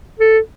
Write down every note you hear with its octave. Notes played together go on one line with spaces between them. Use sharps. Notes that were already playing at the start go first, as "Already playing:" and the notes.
A4